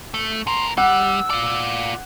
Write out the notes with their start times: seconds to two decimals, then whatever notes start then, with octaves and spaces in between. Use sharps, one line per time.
0.14 A3
0.47 B2 A#4 C6
0.78 G3 F#5 E6
1.30 F4 D5